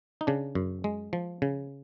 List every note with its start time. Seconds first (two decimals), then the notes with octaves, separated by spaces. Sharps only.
0.21 D#4
0.27 C#3 D4
0.55 F#2
0.84 G#3
1.13 F3
1.42 C#3